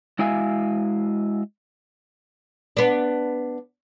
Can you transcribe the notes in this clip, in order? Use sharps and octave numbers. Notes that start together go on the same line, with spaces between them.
G#3 E4 F#4 E5 F5 G#5
B3 D4